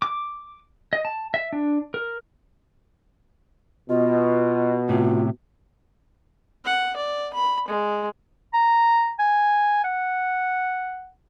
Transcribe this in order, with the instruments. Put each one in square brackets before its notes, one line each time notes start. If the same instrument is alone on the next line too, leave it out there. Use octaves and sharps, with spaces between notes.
[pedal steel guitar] D6
D#5
A5
E5
D4
A#4
[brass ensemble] B2 [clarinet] F4 [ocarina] D#5
[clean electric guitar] A2 C3 [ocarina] F4
[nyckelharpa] F#5
D5
B5
G#3
[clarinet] A#5
G#5
F#5